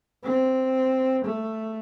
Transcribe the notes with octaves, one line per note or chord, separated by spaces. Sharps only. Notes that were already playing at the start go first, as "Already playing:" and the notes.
C4
A3